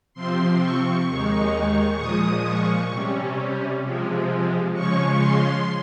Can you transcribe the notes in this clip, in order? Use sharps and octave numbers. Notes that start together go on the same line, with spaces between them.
C3 F3 C4 C6
C#6
D#2 D#3 G#3 D#4
A#2 F3 G#3 D#6
C#6
C3 G3 C#4
C3 F3 G#3
C#3 F3 G#3 C#4 C#6
C6